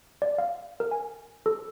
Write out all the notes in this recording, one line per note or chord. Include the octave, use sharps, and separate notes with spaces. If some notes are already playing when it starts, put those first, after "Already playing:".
D5
F5
A#4
G#5
A4